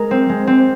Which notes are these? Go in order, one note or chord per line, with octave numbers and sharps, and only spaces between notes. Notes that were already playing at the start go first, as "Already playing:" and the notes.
Already playing: G#3 A#4
C4
G#3
C4